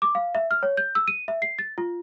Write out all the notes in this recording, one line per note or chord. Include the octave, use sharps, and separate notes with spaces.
D6
F5
E5
F6
C#5
G6
E6
D#7
E5
C7
A6
F4